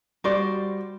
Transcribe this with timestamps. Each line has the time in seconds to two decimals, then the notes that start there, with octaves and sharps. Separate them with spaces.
0.24 G3 F#4 C5 D5